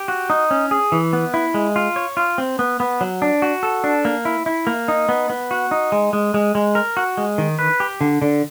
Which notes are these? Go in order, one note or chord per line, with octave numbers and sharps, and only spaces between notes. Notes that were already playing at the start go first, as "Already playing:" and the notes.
Already playing: G4
F#4
D#4
C#4
G#4
E3
B3
E4
G#3
F4
C#5
F4
C4
B3
B3
F#3
D4
F#4
A4
D4
A#3
E4
E4
A#3
D#4
B3
B3
F#4
D#4
G#3
G#3
G#3
G#3
A#4
F#4
G#3
D#3
B4
G4
D3
D3